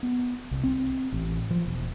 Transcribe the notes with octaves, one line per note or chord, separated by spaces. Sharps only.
B3
C2
C4
A1
F3
E1